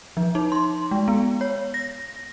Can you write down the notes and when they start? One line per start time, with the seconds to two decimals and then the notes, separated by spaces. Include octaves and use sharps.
0.17 F3
0.35 D#4
0.52 C6
0.91 G#3
1.08 B3
1.41 C#5
1.74 A#6